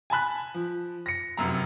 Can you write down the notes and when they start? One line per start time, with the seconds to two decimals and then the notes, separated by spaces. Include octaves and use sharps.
0.10 G#5 A5 B5 F#6
0.54 F3
1.06 A#6 C#7
1.37 F1 F#2 A#5